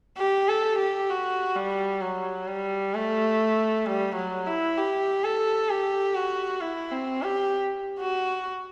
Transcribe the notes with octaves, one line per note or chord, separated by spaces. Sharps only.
G4
A4
G4
F#4
G3
F#3
G3
A3
G3
F#3
E4
G4
A4
G4
F#4
E4
C4
G4
F#4